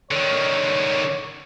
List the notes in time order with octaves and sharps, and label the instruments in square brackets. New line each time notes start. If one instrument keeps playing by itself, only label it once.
[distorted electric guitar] D3 D#3 [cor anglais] C#5